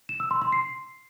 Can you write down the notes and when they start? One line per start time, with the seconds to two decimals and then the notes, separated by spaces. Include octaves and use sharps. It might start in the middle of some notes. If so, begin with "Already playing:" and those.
0.09 E7
0.20 E6
0.31 C6
0.42 C6
0.52 C7